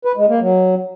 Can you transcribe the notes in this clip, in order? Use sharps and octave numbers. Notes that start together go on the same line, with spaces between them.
B4
G#3
A#3
F#3